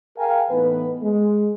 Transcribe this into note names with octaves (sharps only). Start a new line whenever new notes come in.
G#4 A#4 F5 G5 G#5
A2 E3 B3 D#4 B4
G#3